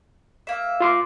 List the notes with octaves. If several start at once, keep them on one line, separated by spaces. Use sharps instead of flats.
A#3 E5
F4 C6 D6